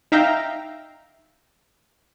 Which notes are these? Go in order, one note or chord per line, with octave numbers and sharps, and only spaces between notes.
D#4 E5 F5 G5 A#5